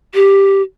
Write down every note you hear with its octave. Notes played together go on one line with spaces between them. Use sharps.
G4